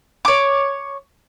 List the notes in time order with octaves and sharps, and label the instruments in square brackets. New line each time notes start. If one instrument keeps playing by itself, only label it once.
[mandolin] C#5 D6